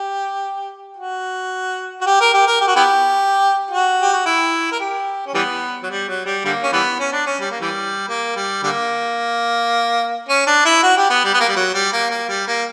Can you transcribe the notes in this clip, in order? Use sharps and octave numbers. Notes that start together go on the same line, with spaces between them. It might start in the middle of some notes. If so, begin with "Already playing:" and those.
Already playing: G4
F#4
F#4
G4
A#4
G4
A#4
G4
F#4
B3 E4 G4
F#4
G4
F#4
E4
A#4
G4
C#4
E3 G3 B3
F#3
G3
F#3
G3
D3 G3 A#3
C#4
E3 G3 B3
C#4
D4
C#4
G3
A#3
E3 G3
A#3
G3
D3 G3 A#3
C#4
D4
E4
F#4
G4
B3
G3
B3
A#3
G3
F#3
G3
A#3
A#3
G3
A#3